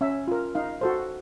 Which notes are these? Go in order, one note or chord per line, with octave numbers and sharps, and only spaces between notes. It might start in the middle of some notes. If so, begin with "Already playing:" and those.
C#4 E5
F4 A#4
D#4 F5
F#4 A4 C5